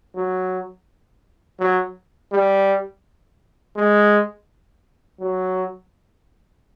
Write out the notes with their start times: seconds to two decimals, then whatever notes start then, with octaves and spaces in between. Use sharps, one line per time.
0.15 F#3
1.59 F#3
2.32 G3
3.76 G#3
5.20 F#3